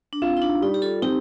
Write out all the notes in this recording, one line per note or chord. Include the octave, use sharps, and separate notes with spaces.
D4
C4 F4
D#4
D4
G3 D#4
G4
F4 A4
C4 D#4 G4